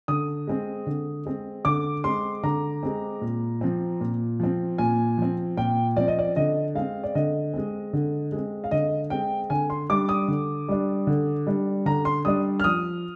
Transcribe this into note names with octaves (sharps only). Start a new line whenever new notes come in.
D3 D#6
G#3 C4
D3
G#3 C4
D3 D6
G#3 C4 C6
D3 A#5
G#3 C4
A#2
F3 C4
A#2
F3 C4
A#2 G#5
F3 C4
A#2 G5
F3 C4 D5
D#5
D5
D3 D#5
G#3 C4 F5
D5
D3 D#5
G#3 C4
D3
G#3 C4
F5
D3 D#5
G#3 C4 G5
D3 G#5
C6
G3 D4 D6
D#6
D3
G3 D4
D3
G3 D4
D3 A#5
C6
G3 D4 D#6
F6
F3 D#6